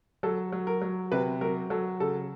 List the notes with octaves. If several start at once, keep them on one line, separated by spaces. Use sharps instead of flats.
F#3 A4
F#3
A#4
F#3
C3 B4
F#3 A#4
F#3 A4
C#3 A4